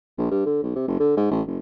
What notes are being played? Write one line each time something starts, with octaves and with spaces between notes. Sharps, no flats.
A#1
G2
D3
B1
C3
F#1
D3
G#2
A1
F#1